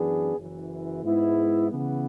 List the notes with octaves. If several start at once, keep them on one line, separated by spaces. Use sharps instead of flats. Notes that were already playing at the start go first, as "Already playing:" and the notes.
Already playing: F#2 E3 B3 D4 G#4
F#1 F#2 E3
G#2 G#3 B3 E4
C#3 E3 B3